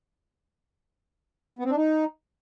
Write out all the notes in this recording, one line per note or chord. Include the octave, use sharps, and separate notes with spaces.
B3
C4
D4
D#4